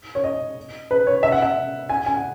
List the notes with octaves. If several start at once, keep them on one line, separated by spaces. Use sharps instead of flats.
C#5
D#5
B4
C#5
E5
F#5
E5
G#5
G#5
F#5